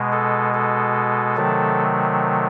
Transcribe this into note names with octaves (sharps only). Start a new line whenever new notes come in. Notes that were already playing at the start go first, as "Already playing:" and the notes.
Already playing: B2 G#3
A4
A4
C3 D#3 F#3 A3